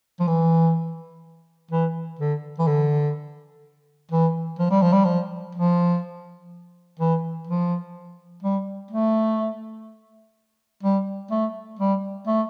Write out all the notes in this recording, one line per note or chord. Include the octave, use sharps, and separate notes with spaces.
F3
E3
E3
D3
E3
D3
E3
F3
G3
F3
G3
F3
F3
E3
F3
G3
A3
G3
A3
G3
A3